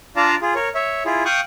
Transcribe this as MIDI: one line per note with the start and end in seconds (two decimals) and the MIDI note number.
0.16 0.35 62
0.16 0.35 65
0.16 0.35 74
0.16 0.35 77
0.16 0.35 81
0.16 0.35 82
0.42 0.54 65
0.42 0.54 68
0.55 0.69 70
0.55 0.69 73
0.75 1.03 73
0.75 1.03 76
1.05 1.23 64
1.05 1.23 65
1.05 1.23 68
1.25 1.40 77
1.25 1.40 79
1.25 1.40 85
1.25 1.40 87
1.25 1.40 90